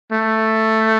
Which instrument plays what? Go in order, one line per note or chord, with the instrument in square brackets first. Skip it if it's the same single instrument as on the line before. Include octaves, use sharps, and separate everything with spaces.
[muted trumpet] A3